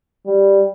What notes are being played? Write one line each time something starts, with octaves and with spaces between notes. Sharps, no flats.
G3